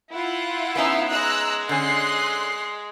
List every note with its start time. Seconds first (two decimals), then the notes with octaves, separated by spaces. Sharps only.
0.12 E4 F4 F#5
0.75 B3 C#4 D#4 E5 F5
1.11 G#3 A#5 E6 F#6
1.69 D3 C#4 C6 F#6 C7